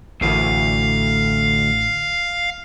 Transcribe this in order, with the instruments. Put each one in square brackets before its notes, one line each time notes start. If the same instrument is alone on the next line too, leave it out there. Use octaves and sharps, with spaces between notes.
[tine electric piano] A1 A2 [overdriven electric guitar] D2 [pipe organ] F5